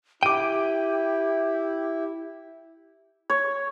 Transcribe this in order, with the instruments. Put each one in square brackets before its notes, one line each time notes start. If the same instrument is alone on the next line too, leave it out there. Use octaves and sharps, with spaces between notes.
[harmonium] E4 [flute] G4 [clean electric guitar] G5 [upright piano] D6 D#7
[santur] C#5